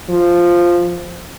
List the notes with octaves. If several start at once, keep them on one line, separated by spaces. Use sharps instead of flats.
F3